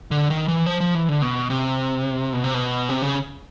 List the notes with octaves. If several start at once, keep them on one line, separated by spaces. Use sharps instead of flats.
D3
D#3
E3
F3
F3
E3
D3
B2
C3
B2
C3
B2
C3
C#3